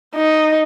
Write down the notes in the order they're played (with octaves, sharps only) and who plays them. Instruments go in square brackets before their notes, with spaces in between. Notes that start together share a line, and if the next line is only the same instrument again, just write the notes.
[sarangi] D#4